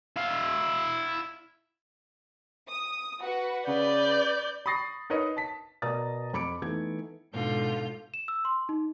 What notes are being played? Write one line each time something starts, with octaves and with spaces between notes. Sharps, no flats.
E4 F5
D#6
F#4 B4 F#5
C#3 B4 D5 G6
B5 C#6 D#6 A6 A#6 C7
D#4 A#4 B4 C#5 D#5
A5 B6
B2 A#4 D5 A#5 D#6 A6
F2 B5 D6 C#7 D7
E3 A3 B3 D#4 E4 G#6
G#2 B2 D3 F4 G6
E7
E6
C6
D#4